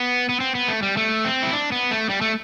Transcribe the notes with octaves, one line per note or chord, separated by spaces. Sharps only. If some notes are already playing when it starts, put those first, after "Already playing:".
Already playing: B3
B3
C4
B3
A3
G3
A3
C4
E4
D4
B3
A3
G3
A3